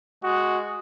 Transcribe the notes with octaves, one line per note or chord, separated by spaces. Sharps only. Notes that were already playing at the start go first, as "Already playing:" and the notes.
G#3 F#4